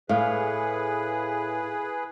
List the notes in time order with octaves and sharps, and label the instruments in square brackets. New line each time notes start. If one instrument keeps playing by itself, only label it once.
[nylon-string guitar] A2 [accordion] G#4 B4 [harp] F5